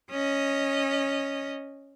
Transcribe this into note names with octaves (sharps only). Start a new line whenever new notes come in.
C#4 D#5